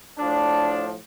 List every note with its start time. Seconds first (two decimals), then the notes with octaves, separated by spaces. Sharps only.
0.18 A2 F3 D4